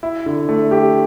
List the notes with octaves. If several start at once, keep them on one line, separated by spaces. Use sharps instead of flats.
E4
D3
A3
G4